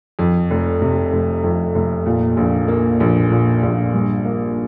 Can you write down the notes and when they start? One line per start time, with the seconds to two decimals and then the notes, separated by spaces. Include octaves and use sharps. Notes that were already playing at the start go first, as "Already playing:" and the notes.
0.19 F2
0.50 F1
0.82 C3
1.12 F1
1.44 F2
1.75 F1
2.06 A#2
2.37 A#1
2.68 A#3
3.00 A#1
3.31 A#2
3.63 A#1
3.93 G2
4.25 A#3